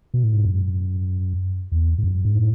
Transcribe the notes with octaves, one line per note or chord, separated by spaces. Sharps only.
B2
A2
G#2
F#2
E2
G#2
F#2
G#2
A2